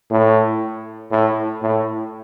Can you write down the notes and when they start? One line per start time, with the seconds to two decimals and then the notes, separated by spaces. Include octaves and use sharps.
0.11 A2
1.11 A2
1.62 A2